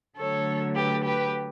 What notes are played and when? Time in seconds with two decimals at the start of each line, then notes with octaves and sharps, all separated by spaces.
0.17 D3 F#3 A3 A4 C#5
0.75 G4 B4
1.04 G4 B4